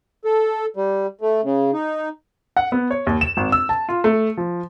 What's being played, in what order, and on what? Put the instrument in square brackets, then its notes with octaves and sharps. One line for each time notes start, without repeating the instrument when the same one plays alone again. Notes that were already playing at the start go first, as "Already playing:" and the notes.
[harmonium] A4
G3
A3
C#3
D#4
[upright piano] F#5
B3
C#5
D#2
E7
G#1
E6
A5
F4
A3
F3